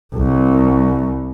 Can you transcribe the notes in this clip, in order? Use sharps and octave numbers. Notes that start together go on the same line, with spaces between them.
C2